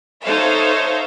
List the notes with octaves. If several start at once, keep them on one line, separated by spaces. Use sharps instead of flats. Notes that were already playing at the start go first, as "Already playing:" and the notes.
D#4 A4 C5 C#5 E5 F5